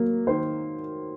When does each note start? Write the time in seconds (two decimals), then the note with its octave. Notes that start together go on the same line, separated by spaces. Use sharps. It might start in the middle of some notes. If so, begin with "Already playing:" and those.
Already playing: F#3 A#3
0.27 D#3 C5